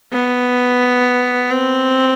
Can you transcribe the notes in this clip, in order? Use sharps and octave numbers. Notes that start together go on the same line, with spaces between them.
B3
C4